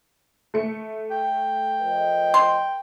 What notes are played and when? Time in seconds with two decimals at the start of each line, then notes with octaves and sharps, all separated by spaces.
0.54 A3 C#7
1.11 G5
1.81 F3 A#4 D#5
2.34 C6